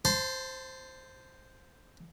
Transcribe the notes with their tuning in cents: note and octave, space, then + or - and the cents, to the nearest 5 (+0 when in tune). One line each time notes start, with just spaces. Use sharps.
C5 +0 A5 +10 C6 -40